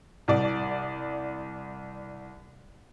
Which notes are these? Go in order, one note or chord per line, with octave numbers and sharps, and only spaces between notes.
C2 D5